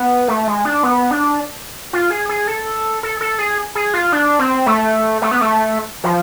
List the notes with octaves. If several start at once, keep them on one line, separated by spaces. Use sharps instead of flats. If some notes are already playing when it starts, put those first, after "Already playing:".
Already playing: B3
A3
G#3
D4
B3
D4
F4
G#4
G#4
A4
A4
A4
G#4
G#4
F4
D4
C4
A3
A3
B3
A3
F3